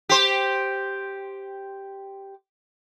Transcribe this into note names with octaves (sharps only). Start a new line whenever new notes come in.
G4 C5